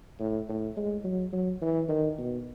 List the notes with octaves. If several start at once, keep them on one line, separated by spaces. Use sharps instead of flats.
A2
A2
G#3
F#3
F#3
E3
D#3
B2